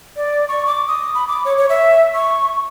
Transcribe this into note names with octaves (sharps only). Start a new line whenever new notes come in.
D5
C#6
D6
D#6
B5
D6
C#5
C#5
E5
C#6